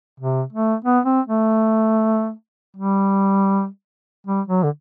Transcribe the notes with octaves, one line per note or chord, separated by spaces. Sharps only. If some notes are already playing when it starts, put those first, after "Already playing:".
C3
A3
B3
C4
A3
G3
G3
F#3
D3